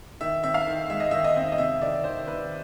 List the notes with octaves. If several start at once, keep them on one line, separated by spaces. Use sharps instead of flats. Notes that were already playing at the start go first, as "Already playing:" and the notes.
D#3 E5
C4 E5
F5
D#3
G#3 E5
D#5
D#3 E5
D#5
C4
D#5
C3 E5
D#3 D5
D#3 C5
D#3 B4